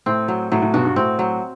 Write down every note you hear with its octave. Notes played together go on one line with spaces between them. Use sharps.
A2 C4
F#3
A2 F#3
A2
G2 B2 F#4
G2
A2 C4
F#3